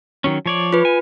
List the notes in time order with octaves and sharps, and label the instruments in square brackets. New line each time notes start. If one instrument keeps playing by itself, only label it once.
[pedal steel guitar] D#3 F#3 C#4
F3 C#5 D5
[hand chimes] F4 B4
[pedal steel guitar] G#5